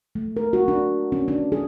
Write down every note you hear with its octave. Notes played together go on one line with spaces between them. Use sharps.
A3
A#4
F#4
D4
C#4
D4
G#4